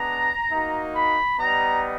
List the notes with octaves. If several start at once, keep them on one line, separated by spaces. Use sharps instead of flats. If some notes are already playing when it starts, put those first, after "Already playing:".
Already playing: G#3 B3 D4 A#5
A#3 D#4 F#4
B5
G3 B3 D#4 A#5